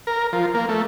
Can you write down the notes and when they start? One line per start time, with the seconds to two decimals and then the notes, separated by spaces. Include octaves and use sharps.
0.07 A#4
0.33 F3
0.54 A#3
0.69 A3